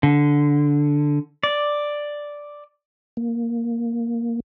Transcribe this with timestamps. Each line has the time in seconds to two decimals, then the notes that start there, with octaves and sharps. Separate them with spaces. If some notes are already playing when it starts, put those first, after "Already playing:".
0.03 D3
1.43 D5
3.17 A#3